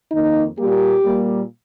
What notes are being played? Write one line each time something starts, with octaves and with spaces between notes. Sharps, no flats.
F2 D#3 A#3 D#4
A#2 G3 A#3 G4
A#2 G3 A#3